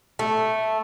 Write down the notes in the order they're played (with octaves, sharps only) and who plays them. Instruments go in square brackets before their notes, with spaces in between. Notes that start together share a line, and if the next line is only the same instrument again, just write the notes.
[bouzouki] A3